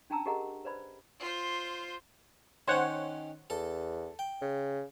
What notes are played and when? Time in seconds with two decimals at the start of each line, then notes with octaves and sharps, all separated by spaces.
0.10 C#4 D4 G5 A5 A#5 E6
0.26 G4 G#4 A#4 D#5 F#5 A#5
0.65 B4 C5 D5 B5
1.20 F4 C5
2.68 D#3 C#4 C5 C#5 F#5
3.50 E2 A4
4.19 G5
4.41 C#3